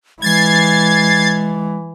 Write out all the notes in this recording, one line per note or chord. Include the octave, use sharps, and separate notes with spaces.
E3 G#3 G#6 A6 C7